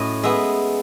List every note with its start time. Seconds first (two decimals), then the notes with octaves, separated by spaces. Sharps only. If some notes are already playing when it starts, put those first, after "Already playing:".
Already playing: A2 F#3 C#4 D#5
0.23 G#3 B3 E5